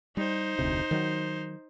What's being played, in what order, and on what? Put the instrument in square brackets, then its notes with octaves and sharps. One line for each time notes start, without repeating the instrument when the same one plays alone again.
[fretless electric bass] G3 [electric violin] D#4 C5
[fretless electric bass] F1 D2 C3
D#3 F#3